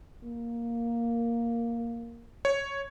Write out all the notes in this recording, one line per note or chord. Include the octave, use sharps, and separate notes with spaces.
A#3
C#5